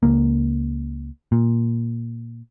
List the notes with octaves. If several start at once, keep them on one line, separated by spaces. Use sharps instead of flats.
C#2 A#3
A#2